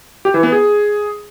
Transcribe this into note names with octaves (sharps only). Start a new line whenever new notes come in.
G4
E3
B3
G#4